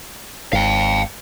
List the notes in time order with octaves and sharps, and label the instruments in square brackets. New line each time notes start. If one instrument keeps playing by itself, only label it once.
[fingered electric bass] G#1 [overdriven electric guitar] F5 G5